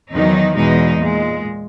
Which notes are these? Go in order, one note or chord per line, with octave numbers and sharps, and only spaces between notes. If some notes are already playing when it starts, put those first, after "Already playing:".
E2 D#3 F#3 D#4
E2 B2 G#3 D#4
A#2 G#3